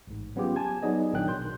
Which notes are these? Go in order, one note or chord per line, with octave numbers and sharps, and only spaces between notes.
A1 G#2
F#3 B3 C#4 F4 G4 G#4
G#5 A5 G#6
F#3 B3 D#4 G#4 D5 D#5
A#1 D#3 F#3 D4 G5 F#6
B2 C6 G6